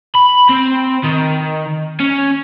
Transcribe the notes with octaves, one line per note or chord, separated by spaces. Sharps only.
B5
C4
D#3
C#4